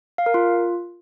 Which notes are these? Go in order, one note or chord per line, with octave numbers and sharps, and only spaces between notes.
F5
A#4
F4